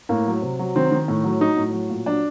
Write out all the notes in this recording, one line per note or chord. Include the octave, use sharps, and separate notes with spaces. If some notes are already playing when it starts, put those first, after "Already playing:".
A2 A#3
F#3
C3
F#3
D#3 C4
D#3
A2
F#3
F#3 D#4
A2
F#3
A#2
F#3 D4